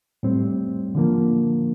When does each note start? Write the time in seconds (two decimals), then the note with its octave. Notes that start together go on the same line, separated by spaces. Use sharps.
0.23 A2 G3 C4
0.95 D3 F3 A#3